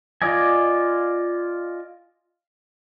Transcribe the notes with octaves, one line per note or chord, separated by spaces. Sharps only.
F4 D5 D#5 G#5